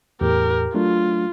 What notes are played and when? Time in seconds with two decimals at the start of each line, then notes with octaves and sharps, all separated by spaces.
0.21 E2 A2 G4 A#4
0.74 F#3 A3 D4 F4